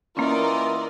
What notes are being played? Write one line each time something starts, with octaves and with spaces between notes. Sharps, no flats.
E3 A#3 C#4 F4 A#4 D5 D#5